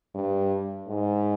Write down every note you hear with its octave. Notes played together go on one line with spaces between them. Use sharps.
G2
G#2